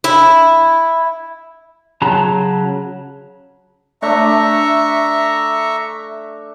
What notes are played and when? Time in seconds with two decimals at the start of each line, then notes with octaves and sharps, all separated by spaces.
0.04 E4
2.02 C#3 F#3 A5 A#5
4.02 A3 D4 E5 A#5 C#6